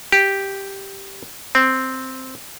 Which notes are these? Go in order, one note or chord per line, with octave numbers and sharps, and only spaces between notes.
G4
C4